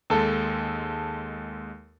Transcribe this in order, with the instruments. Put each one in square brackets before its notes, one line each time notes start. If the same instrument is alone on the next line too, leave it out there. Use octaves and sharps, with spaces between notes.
[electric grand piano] D#2 G#3 [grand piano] A4 A5